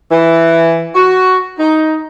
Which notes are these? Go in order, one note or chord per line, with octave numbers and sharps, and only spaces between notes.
E3
F#4
D#4